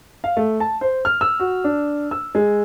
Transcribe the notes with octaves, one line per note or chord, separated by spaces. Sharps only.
F5
A3
A5
C5
F6
E6
F#4
D4
E6
G#3